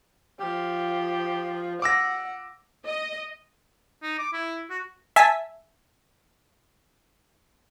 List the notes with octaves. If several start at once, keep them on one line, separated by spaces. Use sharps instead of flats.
F3 G4
F#5 D6 E6 A#6
D#5
D#4
D6
E4
F#4
E5 G#5 A5 B6